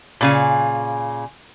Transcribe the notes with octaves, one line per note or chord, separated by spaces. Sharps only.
A#2 C#3 G#5